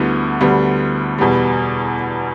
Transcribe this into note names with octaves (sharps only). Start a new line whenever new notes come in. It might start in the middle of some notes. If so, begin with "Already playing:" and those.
Already playing: D2 D3 G3 B3 E4
D2 D3 G3 B3
E2 B2 G3